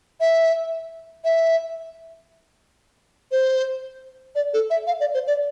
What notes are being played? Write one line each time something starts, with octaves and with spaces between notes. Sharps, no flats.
E5
E5
C5
D5
A4
E5
F5
D5
C5
D5